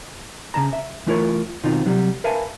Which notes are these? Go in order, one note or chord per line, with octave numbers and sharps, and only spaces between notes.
C#3 G#3 A5 A#5
E5
E3 A3 E4 F4 A#4 C#5
B2 D#3 C4 D#4 F4
C3 F#3 G3
A#4 B4 E5 F5 G#5 A5